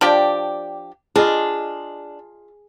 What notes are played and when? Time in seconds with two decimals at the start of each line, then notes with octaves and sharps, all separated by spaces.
0.01 F3 D4 G4 D5 G5
1.16 D4 F4 G#4 D#5